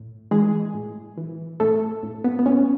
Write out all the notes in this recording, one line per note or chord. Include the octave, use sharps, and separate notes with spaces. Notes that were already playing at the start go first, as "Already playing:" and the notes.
Already playing: A2
E3 G#3 G#4
A2
E3
A2 A3 A4
A2
B3
B3
A2 C#4